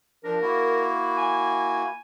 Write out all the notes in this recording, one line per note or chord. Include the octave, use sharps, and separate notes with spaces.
F3 D4 A#4
A#3 E4 F#4
G#5